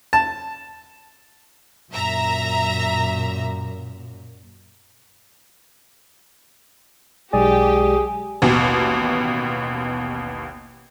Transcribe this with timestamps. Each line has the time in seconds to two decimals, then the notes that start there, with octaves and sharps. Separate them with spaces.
0.13 A5
1.92 F#2 A#2 E5 A#5
7.33 B1 G#3 G4 G#4 D5
8.42 A1 D#2 B2